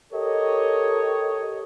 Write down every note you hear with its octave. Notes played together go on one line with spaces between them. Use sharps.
G4 A4 A#4 C#5 D#5